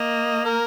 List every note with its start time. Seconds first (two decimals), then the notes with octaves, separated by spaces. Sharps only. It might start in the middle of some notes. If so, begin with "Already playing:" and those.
Already playing: A#3 D#5
0.45 A#4